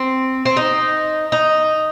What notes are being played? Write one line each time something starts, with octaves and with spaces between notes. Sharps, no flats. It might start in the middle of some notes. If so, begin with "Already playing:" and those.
Already playing: C4
C4
D#4
D#4